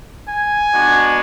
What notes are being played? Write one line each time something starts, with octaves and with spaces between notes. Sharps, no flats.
G#5
G#3 B3 D4 F#4